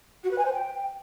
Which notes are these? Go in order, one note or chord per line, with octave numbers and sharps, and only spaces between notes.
F#4
B4
G#5
C5
G5